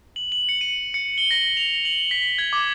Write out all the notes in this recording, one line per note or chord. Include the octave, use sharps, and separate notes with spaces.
F#7
F#7
C#7
D#7
C#7
G7
A#6
F7
F#7
B6
G#6
D6